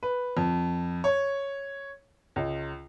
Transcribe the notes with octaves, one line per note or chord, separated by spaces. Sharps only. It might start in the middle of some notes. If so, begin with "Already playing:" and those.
B4
F2
C#5
C#2